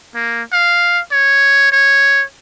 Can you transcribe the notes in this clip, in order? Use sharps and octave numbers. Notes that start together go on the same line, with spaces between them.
A#3
F5
C#5
C#5